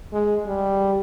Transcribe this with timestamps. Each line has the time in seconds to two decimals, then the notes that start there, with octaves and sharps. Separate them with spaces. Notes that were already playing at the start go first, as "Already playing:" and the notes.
0.12 G#3
0.46 G3